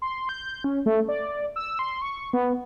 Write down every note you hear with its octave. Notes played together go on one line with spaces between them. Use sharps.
C6
G6
C#4
A3
D5
E6
C6
C#6
B3